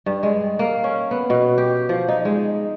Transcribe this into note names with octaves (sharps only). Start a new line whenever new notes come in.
G2
G#3
A#3
C#4
B3
B2
G4
F3
D#4
G#3